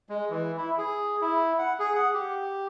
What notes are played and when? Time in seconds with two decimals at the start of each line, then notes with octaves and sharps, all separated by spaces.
0.09 G#3
0.30 E3
0.57 E4
0.78 G#4
1.21 E4
1.59 F#5
1.79 G#4
1.95 F#5
2.14 G4